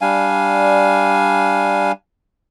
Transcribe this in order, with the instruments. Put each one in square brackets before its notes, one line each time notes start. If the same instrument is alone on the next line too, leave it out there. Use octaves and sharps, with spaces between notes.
[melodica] G3 D4 F5 G#5